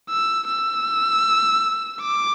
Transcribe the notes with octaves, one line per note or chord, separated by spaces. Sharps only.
E6
E6
D6